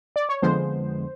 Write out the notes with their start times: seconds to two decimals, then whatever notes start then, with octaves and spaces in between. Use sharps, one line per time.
0.16 D5
0.29 C#5
0.42 F2 D3 F3 G#3 B3 C5